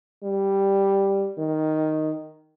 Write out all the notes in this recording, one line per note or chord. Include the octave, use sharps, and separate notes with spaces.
G3
D#3